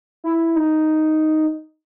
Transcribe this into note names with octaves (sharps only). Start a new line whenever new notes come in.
E4
D#4